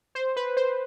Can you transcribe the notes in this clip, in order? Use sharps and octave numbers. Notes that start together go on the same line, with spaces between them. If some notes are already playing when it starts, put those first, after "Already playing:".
C5
B4
C5